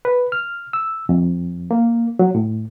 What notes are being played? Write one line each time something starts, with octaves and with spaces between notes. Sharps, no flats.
B4
F6
E6
F2
A#3
F#3
A2